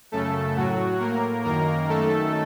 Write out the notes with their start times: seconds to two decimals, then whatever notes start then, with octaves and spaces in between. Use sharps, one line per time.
0.12 F#2 C#3 A3 A4
0.56 A2 F#3 F#4
1.00 A2 A#3 A#4
1.44 F#2 D#3 A#3 A#4
1.89 F#2 D#3 A3 A4